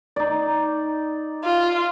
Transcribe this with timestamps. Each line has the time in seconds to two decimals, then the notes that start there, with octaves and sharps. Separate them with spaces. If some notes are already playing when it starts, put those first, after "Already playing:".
0.16 D#4 D5
1.45 F4